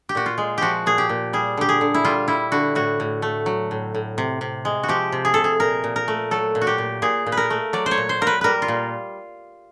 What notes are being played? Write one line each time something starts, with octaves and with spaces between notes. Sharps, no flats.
G4
A#2 F#4
F4
G#3
F3 F#4 G4
A#2 G#4
G4
A#2
G3 G#4
D3 G4
G#4
D3
E4
G3 F4
G3 E4
D3 F#4
A2 F#4
A2
A3
F#3
A2
A2
C3
C3
G#3
F#4
F3 G4
C3
G#4
C3 A4
G#4
A#2 A#4
A#2
A#4
A3
F#3 A4
A#2
F#4
G4
A#2
A#2 G#4
A#2
B4
A#4
A3
F#3 D5
C5
C#5
A#2
C5
A#2 A#4
B4
G3 A#4 B4
F4
A#2